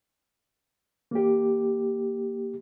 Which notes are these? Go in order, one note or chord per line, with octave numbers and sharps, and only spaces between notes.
A#3 G4